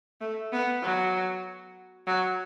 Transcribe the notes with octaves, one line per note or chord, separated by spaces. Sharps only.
A3
B3
F#3
F#3